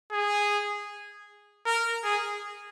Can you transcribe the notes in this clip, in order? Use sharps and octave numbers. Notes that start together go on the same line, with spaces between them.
G#4
A#4
G#4